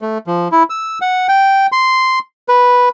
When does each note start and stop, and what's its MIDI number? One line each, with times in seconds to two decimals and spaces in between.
0.01 0.18 57
0.27 0.48 53
0.52 0.63 64
0.70 0.99 88
1.01 1.27 78
1.28 1.67 79
1.72 2.19 84
2.49 2.89 71